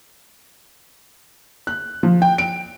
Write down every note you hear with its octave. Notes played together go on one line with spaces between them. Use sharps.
F#6
F3
G5
D7